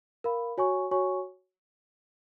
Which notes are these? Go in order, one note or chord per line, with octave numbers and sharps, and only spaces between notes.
A#4 F5 B5
F#4 C#5 G#5 C#6
F#4 C#5 G#5 C#6